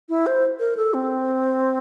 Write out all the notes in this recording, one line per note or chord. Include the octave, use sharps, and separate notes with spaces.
E4
C5
A#4
A4
C4